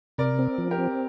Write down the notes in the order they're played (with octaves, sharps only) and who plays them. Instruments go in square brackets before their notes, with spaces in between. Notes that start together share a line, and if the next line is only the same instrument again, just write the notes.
[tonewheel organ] C3 [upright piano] A#4 D5
[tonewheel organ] C4
F3
[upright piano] G4 A#4
[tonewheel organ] C4